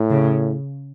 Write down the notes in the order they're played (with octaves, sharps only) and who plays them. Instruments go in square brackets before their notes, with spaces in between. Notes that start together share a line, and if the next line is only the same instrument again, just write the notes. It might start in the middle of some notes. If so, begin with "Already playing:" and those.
Already playing: [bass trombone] A2
[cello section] C#3